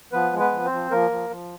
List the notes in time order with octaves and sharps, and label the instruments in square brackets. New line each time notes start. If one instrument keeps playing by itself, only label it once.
[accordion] F3 B3 B4
G#3
B3 B4
F3
C4 C5
F3
F3 A#3 A#4
F3
F3